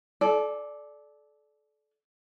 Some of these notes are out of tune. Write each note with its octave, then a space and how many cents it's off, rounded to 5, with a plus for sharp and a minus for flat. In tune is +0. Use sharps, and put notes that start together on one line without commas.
A4 -30 D5 +0 G#5 +20